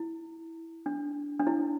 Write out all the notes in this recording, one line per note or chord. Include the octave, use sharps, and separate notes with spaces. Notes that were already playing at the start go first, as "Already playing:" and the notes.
Already playing: E4
D4
D4
E4